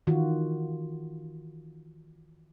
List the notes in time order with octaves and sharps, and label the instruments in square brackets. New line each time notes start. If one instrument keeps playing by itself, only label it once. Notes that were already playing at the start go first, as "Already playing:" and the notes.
[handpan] D#3 E3 F4 F#4